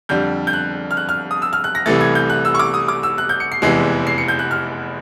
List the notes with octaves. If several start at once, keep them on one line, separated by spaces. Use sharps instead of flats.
F2 D3 G3 G6
G6
F#6
F6
F#6
F6
D#6
E6
F6
F#6
A#6
C2 C3 E3 A3 A6
G#6
G6
F#6
E6
C#6
D6
D#6
D6
E6
F#6
G6
C#7
C7
F1 E2 C3 E3 G#3 C7
C7
C#7
G6
F#6
F6